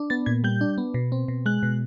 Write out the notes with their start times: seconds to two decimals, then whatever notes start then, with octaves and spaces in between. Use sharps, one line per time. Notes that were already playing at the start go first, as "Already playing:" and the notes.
Already playing: D4
0.10 B3 A6
0.26 A#2 G#6
0.44 G3 G6
0.61 D4
0.78 B3
0.94 B2
1.12 C4
1.28 B2
1.46 G#3 F#6
1.63 B2